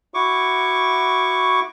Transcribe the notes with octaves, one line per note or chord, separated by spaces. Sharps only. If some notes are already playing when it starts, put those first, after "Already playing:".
E4 F#4 C#6 D6